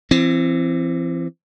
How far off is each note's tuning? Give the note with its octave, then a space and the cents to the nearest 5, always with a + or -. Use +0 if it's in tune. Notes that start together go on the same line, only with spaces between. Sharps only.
E3 +35 C4 +0